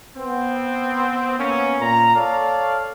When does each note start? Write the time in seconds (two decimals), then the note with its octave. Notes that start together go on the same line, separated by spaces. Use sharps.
0.16 B3 C4
1.40 A#3 B3 C#4
1.80 A#2 A#5
2.16 A4 C#5 D5 F5